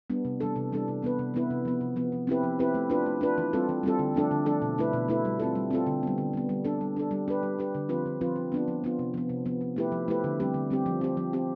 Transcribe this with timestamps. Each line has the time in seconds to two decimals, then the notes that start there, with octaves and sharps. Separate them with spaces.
0.10 G3 B3 D4
0.25 C3
0.41 E3 G3 D4 A4
0.56 C3
0.72 E3 G3 D4 A4
0.88 C3
1.02 E3 B3 E4 B4
1.19 C3
1.34 E3 B3 E4 B4
1.50 C3
1.65 F3 B3
1.81 C3
1.96 F3 B3
2.12 F3
2.27 C4 E4 G4 B4
2.43 F3
2.59 C4 E4 G4 B4
2.74 A3
2.90 D4 F4 B4
3.06 A3
3.21 D4 F4 B4
3.38 E3
3.53 G3 C4 F4 A4
3.69 E3
3.83 G3 C4 F4 A4
3.99 D3
4.14 F3 A3 D4 A4
4.31 D3
4.46 F3 A3 D4 A4
4.62 B2
4.78 A3 E4 B4
4.93 B2
5.08 A3 E4 B4
5.25 G3
5.40 C4 F4 A4
5.55 G3
5.71 C4 F4 A4
5.86 D3
6.03 G3 B3
6.18 D3
6.33 G3 B3
6.49 G3
6.65 D4 A4
6.81 G3
6.97 D4 A4
7.11 G3
7.28 D4 G4 B4
7.43 G3
7.59 D4 G4 B4
7.75 D3
7.89 F3 C4 F4 B4
8.06 D3
8.21 F3 C4 F4 B4
8.36 F3
8.52 B3 D4 F4
8.68 F3
8.84 B3 D4 F4
8.99 C3
9.14 F3 B3
9.29 C3
9.46 F3 B3
9.61 F3
9.76 A3 E4 G4 B4
9.92 F3
10.08 A3 E4 G4 B4
10.24 D3
10.40 G3 C4 G4
10.54 D3
10.70 G3 C4 G4
10.86 F3
11.01 C4 G4
11.17 F3
11.33 C4 G4